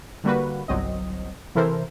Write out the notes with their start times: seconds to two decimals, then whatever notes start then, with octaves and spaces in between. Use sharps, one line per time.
0.24 D3 G3 A#3 F#4 B4
0.68 G1 C2 F#3 C4 D#5
1.55 C3 E3 E4 A4 A#4 C5